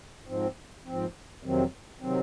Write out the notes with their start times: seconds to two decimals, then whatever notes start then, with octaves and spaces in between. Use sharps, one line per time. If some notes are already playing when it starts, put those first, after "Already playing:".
0.26 G#2 F3 C4
0.85 G#2 F3 C4
1.44 F2 C3 D#3 F#3 C4
2.01 C3 D#3 F#3 C4